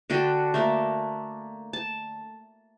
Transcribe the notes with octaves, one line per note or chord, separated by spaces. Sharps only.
D3 D4 F#4 G5
A3 A#3 A#4
A5